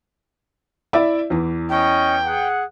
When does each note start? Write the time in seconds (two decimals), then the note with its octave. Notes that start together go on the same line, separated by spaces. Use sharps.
0.93 E4 D5 E5
1.30 E2 E3
1.70 C#4 D#5 G5 C#6
2.24 G#4 F#5